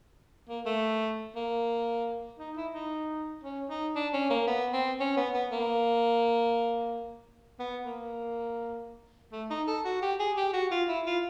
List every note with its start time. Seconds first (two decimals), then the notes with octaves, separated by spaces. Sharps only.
0.49 A#3
0.66 A3
1.36 A#3
2.39 D#4
2.57 E4
2.74 D#4
3.43 C#4
3.69 D#4
3.96 D4
4.13 C#4
4.30 A#3
4.47 B3
4.73 C4
5.00 C#4
5.16 B3
5.34 B3
5.51 A#3
7.60 B3
7.85 A#3
9.32 A3
9.50 D#4
9.67 A4
9.85 F#4
10.02 G4
10.19 G#4
10.37 G4
10.53 F#4
10.71 F4
10.89 E4
11.06 F4